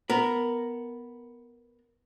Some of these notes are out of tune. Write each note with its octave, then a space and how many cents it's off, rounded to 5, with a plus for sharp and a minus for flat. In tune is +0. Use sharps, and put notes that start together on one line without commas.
B3 +0 A#4 +0